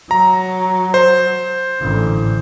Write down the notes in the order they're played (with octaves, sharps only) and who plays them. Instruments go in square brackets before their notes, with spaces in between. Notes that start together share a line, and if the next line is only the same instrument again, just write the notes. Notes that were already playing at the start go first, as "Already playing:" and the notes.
[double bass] F#3 [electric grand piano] A#5
[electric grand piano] C5
[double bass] A1 D3